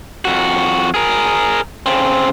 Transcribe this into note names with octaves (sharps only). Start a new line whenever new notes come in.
F2 F#4
G#4 A#4
C#3 C4